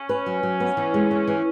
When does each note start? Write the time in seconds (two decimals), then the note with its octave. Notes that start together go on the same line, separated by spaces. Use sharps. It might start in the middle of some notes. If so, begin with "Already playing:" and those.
Already playing: C#4
0.09 B4
0.26 F#3
0.43 F#3
0.60 B3
0.77 E3
0.94 G#3
1.11 E3
1.28 E3